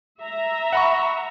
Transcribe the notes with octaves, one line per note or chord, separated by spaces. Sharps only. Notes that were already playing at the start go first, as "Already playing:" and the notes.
E5 A#5
F#5 B5 C#6